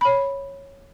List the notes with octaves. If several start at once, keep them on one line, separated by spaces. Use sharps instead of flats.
C#5 B5